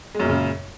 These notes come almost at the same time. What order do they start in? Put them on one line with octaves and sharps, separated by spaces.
G#3 F#2 A#2 C#3